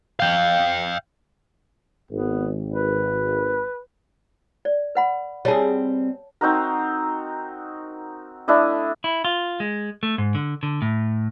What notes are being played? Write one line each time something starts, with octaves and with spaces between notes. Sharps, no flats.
F5 G5
G#1 B3
B4
D5
B4 F#5 B5
G3 C4 G#4 C#5 A5
C4 D#4 F#4 A#4
A3 D4 E4 D#5
E4
F4
G#3
A3
G#2
D3
D3
A2